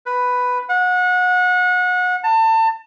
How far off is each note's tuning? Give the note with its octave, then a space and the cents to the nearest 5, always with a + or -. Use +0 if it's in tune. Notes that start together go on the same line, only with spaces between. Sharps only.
B4 +5
F#5 -30
A5 +30